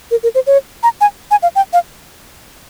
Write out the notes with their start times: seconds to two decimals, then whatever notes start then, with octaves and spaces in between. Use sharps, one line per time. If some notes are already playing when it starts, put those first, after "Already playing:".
0.11 A#4
0.23 A#4
0.35 C5
0.47 C#5
0.83 A#5
1.01 G#5
1.31 G#5
1.43 F5
1.56 G5
1.73 F5